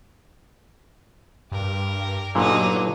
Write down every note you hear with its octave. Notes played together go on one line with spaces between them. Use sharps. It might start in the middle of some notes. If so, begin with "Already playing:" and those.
G2 G4 A#4
G1 A#2 D3 F#3 D#4 C#5